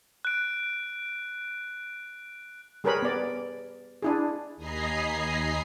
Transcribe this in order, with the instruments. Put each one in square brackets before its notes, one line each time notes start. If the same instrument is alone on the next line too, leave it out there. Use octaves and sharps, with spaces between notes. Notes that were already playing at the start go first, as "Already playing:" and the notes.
[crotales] F#6 D7
[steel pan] G3 G#4 A#4 B4 C#5 B5
B3 D5
D4 E4 G#4
[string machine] D#2 D#5 G#5 A#5 B5 C7